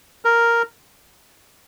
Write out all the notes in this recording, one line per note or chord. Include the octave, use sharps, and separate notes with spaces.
A#4